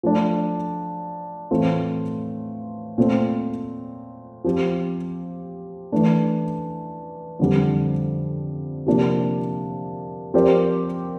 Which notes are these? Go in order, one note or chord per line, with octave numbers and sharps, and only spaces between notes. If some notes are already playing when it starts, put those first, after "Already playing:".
F3 A3 D4
A2 E3 A3 C4 F4
A#2 A3 C4
F3 C4 G4
E3 A3 D4
F2 D3 G3
C3 F3 A#3 D4
F3 C4 G4 A#4 D5